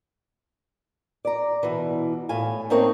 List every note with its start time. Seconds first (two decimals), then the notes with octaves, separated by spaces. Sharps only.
1.25 D5 A#5
1.63 B2 E3
2.29 A2 F5 G#5
2.70 A3 A#3 C4 D#4 A#4 C#5